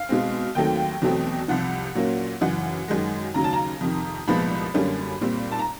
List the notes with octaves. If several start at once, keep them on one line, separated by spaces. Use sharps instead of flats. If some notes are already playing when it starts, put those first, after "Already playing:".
Already playing: F5
B2 G#3 C4
D#2 D#3 F#3 A3 C4 G5
E2 B2 F#3 A3 C4
C2 C3 F3 F#5
A#2 F#3 A#3 C#4
F#2 C#3 E3 F#5
F#2 D#3 G#3
D#2 C#3 F#3 A#5
A5
A#5
F2 C3 D#3
C2 A#2 F3 G#3 B3 B5
F#2 D3 G3 A#3 C#4
A#2 G3 C4
A5
A#5